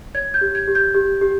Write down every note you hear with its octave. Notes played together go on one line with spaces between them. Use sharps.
C#5 G#6
G6
G4
G#6
G4
G6
G4
G4